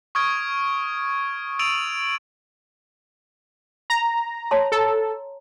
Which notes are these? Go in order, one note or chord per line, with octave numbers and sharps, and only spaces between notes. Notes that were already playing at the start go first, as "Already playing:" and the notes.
C#6 D#6 F6 G#6 D7
E6 A6 D7 D#7 F7 F#7
A#5
C#5 A5 C6
A4 A#5